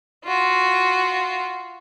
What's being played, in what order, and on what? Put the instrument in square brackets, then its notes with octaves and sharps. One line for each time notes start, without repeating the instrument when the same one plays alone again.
[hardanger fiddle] F4 F#4